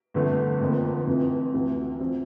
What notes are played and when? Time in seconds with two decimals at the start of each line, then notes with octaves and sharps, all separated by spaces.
0.14 G1 F2 D3 A3
0.61 F1 F2 D3 F3 A#3
1.07 F1 F2 C3 E3
1.54 D2 C3 E3
2.00 F3 C4